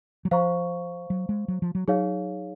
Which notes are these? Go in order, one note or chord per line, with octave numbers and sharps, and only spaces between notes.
F#3
F3 C5 F5 A#5 C#6
F#3
G#3
F#3
F3
F#3
F#3 D#4 G#4 C#5 F5